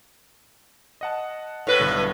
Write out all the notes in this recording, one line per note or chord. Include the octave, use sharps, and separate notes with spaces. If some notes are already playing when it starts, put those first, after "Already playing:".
D#5 F#5 A5
A2 B4
B1 G2 D3